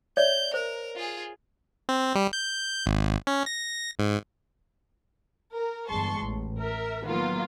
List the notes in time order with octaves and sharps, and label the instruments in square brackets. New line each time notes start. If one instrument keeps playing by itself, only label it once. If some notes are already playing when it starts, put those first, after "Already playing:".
[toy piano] C#5 D5 E5 [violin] G6
[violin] A#4 [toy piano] C5
[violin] F4 G#4
[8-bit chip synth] C4
G3
G6
G#1
C#4
A#6
G#2
[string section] A#4
G1 E2 G#3 A5 C6 C#6
A1
A#4 E5
D#3 F#3 A#3 B3 F4 A#4